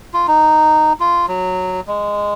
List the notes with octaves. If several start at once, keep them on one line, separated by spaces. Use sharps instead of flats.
F4
D#4
F4
F#3
G#3